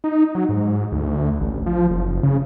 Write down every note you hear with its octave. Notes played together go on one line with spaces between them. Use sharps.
D#4
F#3
G#2
D2
A1
F3
F#1
C#3